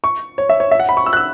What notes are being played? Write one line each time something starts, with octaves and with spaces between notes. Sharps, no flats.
C#6
C#5
E5
C#5
E5
F#5
B5
C#6
E6
F#6
E6